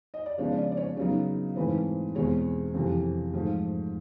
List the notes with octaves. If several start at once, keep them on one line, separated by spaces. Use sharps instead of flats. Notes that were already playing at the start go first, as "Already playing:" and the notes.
D#5
D5
C#3 F3 G#3 B3 D4 C#5
D5
D5
C#5
C#3 F#3 B3 D#4
G#2 E3 A3 C4 B4
E2 B2 G#3 C4 C#5
F2 C3 E3
G#2 F3 A3